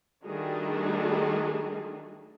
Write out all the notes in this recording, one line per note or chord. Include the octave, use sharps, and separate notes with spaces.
D#3 G3 A3 D4 F#4 G#4